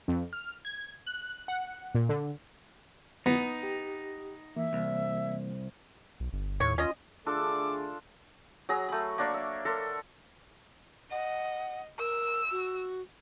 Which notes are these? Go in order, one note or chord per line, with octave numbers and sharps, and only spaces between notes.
F2
F6
G#6
F#6
F#5
A#2
D3
B3 D#4
G4
E3 A#3 E5
C2
B1
G1
D#2 A2 C#5
C#4 F4 D#5
D3 A3 D4 F4 G#4 A4 D6
F#3 G#4 A#5
A3 B5
A#3 D4 C#5
E5
A4 A#4 C6
D#5 F#5
A#4 E6
F#4